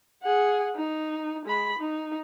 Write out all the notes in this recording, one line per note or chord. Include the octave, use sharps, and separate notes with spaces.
G#4 F#5
D#4
G#3 B5
D#4